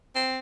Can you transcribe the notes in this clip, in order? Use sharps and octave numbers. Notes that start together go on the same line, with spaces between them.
C4